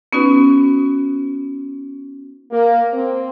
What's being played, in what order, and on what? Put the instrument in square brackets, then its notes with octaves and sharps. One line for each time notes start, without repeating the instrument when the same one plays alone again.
[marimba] B3 C#4 D#4 F#4 B4
[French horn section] A#3
C4